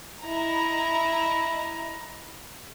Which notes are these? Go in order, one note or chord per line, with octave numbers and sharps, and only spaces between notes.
E4 D#5 A#5